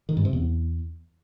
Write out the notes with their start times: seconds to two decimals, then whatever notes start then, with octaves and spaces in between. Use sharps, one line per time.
0.09 D#3
0.17 G2
0.25 C3
0.33 E2